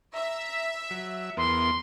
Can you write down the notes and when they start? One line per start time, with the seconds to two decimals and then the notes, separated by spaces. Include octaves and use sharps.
0.14 E5 A#5
0.91 F#3
1.37 E2 B3 A#4 C6